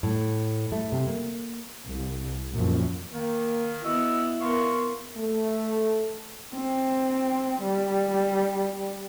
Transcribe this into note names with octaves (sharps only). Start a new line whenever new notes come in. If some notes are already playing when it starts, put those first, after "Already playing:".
A2
A3
C3
A#3
C2
F#2 A#2 F3
D#3 A#3
B3 E4 F#4 D#5 E6
B3 A#4 F5 C6 C#6
A3
C4
G3